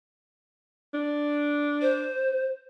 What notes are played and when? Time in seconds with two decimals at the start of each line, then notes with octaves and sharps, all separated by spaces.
0.94 D4
1.82 C5